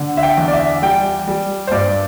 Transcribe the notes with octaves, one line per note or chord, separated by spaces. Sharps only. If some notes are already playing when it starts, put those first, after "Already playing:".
Already playing: D3
E5
G5
E2
D5
E5
G3 G5
G3
C5
G2 D5